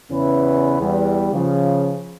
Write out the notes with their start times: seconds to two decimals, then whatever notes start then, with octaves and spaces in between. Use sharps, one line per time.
0.11 E2 C#3 C#4 E4 B4
0.80 E2 G3
1.33 C#3 F3